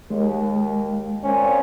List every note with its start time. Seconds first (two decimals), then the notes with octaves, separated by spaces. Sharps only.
0.10 D#2 G#3
1.24 A#2 C4 C#4